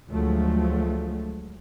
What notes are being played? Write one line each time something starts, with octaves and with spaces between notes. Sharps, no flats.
D2 F3 F#3 G#3 A3